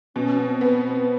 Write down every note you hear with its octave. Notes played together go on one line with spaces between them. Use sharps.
B2 C#4
B3
C4
B3
C4